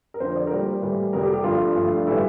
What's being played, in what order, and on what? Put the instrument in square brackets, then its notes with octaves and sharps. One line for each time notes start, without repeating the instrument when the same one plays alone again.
[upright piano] A#4
F2 D3 F3 C5
D5
A#4
A#2 G3 C5
A2 E3 G3
F2 C3 G3 A#4
G4
G4
G2 D3 F3 A3 F4
G2 F3 A3
A2 E3 G3 E4